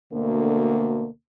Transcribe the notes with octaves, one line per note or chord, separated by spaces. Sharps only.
D2 B2 D3 A#3